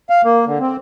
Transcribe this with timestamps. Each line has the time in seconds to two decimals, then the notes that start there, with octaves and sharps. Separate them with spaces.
0.10 F5
0.24 A#3
0.46 D3
0.60 C4